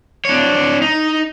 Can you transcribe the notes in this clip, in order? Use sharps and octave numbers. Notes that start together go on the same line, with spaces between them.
D4 C#5
D#4